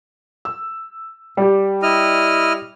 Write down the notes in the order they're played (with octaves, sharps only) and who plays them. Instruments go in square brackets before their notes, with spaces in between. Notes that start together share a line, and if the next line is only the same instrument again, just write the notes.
[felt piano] E6
G3 G4
[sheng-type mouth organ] E4 D#5 F6